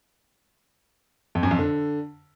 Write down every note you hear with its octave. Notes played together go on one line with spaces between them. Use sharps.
F2
F#2
F2
D3